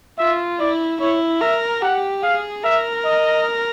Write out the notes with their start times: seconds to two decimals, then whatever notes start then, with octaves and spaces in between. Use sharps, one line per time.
0.19 F4 E5
0.60 E4 D5
1.00 E4 C#5
1.41 A#4 E5
1.82 G4 F#5
2.23 G#4 F5
2.64 A#4 E5
3.05 D#5